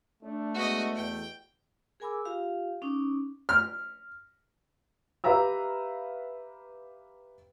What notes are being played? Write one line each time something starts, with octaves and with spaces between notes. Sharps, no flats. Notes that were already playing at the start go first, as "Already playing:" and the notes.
A3 D4
G#3 B3 D4 F#4 D#5
E2 G5
G#4 A#4 G#5 B5 D6 E6
F4 G4 F5
C#4 D#4 D6
F6
G4 B4 E5 F5 A#5 E6